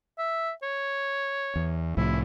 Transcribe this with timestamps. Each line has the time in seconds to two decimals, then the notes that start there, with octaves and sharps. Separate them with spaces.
0.18 E5
0.62 C#5
1.56 E2
1.97 C2 A2 F3 E4